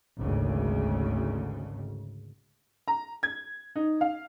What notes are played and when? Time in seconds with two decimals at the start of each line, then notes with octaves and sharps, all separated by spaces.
0.19 G#1 D2 C#3
2.88 A#5
3.23 G#6
3.76 D#4
4.01 F5